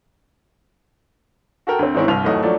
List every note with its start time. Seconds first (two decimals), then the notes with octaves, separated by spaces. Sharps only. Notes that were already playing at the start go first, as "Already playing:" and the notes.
1.67 F#4 A4 A#4 G5
1.79 D2 C4
1.94 G#2 D#3 E3 C4 C#4 E4
2.08 G1 C2 G2 F6 F7
2.24 G#1 D#2 E3 F#3 A3 D#5
2.43 F3 F#3 A3 D4 D5